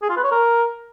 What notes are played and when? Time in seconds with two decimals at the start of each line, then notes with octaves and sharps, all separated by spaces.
0.02 G#4
0.09 F4
0.17 B4
0.24 C#5
0.31 A#4